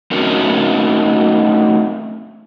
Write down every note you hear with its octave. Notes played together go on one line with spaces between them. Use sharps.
A3 C4 C#4 D#4 F#4 A#4